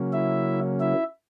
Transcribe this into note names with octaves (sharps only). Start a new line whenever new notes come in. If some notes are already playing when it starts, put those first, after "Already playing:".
Already playing: C#3 F#3 A#3 C#4
E4 E5
E4 E5